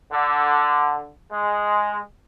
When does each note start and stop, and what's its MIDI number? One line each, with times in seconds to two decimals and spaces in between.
0.12 1.09 50
1.32 2.00 56